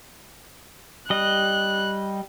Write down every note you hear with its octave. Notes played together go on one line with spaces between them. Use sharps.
G3 D#5 F#6